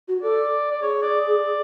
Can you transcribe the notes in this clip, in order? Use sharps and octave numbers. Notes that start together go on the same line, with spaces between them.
F#4
A4 D5
D5
G#4 C#5
D5
D5